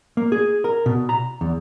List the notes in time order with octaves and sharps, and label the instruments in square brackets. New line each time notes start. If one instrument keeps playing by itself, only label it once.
[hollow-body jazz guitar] A#3
G#4
A#4
B2
A#5
E2